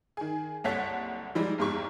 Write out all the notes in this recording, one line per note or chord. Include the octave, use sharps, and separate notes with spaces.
D#3 G#4
F#1 C2 A4 C#5 F#5 B6
E3 F3 G3 G#3 D#4
F1 E2 G#2 G4 C#6